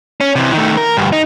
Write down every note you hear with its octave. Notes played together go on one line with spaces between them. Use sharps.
C#4
C3 E3
D#3 A3
A#4
D2 G2
D#4